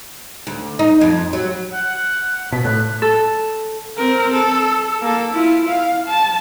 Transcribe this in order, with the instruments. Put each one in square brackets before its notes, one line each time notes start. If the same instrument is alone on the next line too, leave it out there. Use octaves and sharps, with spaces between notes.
[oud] D2
D#4
F2
F#3
[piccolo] F#5
[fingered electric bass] B2 [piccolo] B6
[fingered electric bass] A2 [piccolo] F#6
[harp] A4
[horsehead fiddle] C4 A#4
A4
A#3 A4
E4 F4
F5
A5